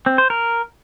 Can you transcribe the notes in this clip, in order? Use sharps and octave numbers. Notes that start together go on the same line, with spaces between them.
C4
C5
A#4